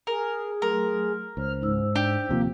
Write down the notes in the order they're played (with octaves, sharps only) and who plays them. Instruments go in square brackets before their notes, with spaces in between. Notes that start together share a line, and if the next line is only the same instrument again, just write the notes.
[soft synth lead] G#4 [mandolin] A#4
[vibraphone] F#3 A3 C6 [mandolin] A#4
[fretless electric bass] C#2 [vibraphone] C5 [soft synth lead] F6
[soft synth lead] G#2 [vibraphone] D#4 C5 E6
[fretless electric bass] D4 [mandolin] G4
[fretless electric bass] D#1 C3 F3 [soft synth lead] A#3